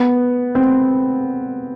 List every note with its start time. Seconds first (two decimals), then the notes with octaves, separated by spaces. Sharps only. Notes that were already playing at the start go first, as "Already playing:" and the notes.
Already playing: B3
0.55 C4